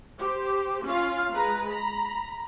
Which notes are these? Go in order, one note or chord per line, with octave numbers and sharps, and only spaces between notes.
G4 C5
C#4 F4 F5
G#3 B4 A#5
A#5 B5